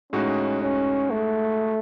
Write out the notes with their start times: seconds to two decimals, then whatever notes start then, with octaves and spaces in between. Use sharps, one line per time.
0.12 A2 G#3 C#4 D#4 F#4
0.62 C#4
1.11 A3